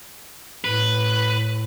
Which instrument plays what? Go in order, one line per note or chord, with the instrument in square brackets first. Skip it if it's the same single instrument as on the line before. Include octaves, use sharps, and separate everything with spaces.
[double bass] A2 [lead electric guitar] B4